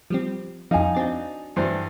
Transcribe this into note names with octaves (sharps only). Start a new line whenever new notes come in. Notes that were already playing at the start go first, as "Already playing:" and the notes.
F3 G3 C4
F2 F3 D#4 F5 G#5
C4 D4 F#4 G#5 A6
G2 E3 C5